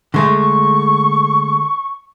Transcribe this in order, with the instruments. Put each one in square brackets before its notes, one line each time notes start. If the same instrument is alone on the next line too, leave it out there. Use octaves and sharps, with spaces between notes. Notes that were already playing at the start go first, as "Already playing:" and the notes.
[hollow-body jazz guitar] D3 G#3 A3 [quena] C#6